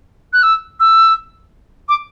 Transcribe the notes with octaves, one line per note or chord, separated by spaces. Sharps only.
F#6
E6
E6
D6